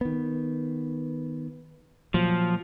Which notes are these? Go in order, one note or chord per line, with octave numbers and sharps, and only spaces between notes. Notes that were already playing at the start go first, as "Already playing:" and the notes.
D#3 B3
A#2 F3 F#3